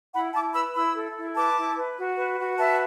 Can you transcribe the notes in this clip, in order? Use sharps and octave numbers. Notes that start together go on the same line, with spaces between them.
E4 F#5 B5
E4 A5 D6
B4 B5 E6
E4 B5 E6
A4
E4
B4 A5 D6
E4
B4
F#4
B4
F#4
B4 E5 A5